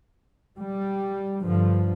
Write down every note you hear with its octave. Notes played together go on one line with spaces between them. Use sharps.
G3
G2 D3 F3